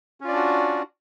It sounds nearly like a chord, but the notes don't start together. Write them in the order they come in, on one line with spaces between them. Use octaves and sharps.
C#4 F4 D5 D4 F#4